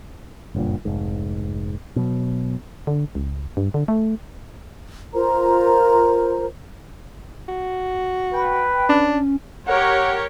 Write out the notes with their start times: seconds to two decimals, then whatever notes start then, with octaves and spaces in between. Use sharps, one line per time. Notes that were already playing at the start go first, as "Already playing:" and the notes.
0.55 F#1 G2 A#2
0.85 F1 G#2
1.96 B2 F#3
2.87 D3
3.15 C#2
3.57 G2
3.74 D3
3.88 A3
5.14 F4 A#4 C5 A#5
7.48 F#4
8.33 B4 G5
8.89 C#4 D4
9.67 G4 A#4 C#5 F#5